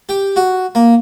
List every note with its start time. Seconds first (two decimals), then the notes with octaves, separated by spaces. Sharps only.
0.09 G4
0.36 F#4
0.75 A#3